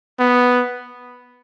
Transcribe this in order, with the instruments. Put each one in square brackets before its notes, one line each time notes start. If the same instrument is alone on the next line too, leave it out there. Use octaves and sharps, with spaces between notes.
[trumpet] B3